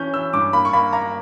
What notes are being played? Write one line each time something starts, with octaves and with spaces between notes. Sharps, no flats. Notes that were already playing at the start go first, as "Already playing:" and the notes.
Already playing: E3 C#4 G6
E3 E6
G2 D6
A#3 B5
C#6
A#3 B5
A#3 A#5